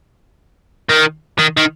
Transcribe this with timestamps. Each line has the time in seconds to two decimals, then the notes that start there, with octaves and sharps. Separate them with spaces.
0.90 D#3
1.39 D#3
1.57 D#3